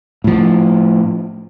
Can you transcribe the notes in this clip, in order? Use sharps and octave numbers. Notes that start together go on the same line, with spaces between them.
A2 F3